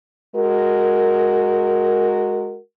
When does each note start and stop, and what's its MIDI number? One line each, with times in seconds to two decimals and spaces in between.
0.36 2.59 56
0.36 2.59 66
0.36 2.59 70